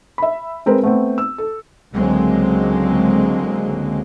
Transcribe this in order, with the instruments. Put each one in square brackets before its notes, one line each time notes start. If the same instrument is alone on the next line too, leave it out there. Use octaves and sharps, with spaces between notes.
[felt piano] E5 B5
G#3 C4 A#4 B4
A3 B3 C4
E6
A4
[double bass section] C#2 D3 F#3 G#3 A#3 C4